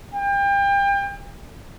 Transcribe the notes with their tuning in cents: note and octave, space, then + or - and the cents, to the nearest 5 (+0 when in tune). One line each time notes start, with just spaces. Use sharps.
G5 +30